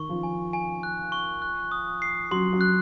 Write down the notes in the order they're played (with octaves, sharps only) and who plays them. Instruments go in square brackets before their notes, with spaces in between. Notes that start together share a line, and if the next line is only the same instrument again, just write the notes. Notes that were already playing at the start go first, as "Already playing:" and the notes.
Already playing: [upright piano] D#3 [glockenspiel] C#6
[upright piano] F3
[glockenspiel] G#5
G#5
F#6
C#6
F#6
D#6
C7
[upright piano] F#3 [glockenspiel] C6
[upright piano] F#3
[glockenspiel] F#6